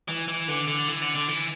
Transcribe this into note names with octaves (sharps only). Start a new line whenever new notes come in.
E3
E3
D3
D3
E3
D3
D3
E3